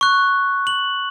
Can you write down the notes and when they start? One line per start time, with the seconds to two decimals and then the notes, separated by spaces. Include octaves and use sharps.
0.01 C#6 F#6
0.67 F#7